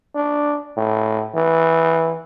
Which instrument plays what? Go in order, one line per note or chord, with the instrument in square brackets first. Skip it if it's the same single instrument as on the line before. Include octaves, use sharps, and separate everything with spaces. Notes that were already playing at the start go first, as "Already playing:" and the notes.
[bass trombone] D4
A2
E3